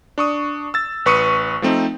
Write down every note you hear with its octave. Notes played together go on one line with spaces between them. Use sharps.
D4 C#6 D#6
E6 A6
A1 B4 C#6 D#6 C#7 D#7
F3 A3 C4 D#4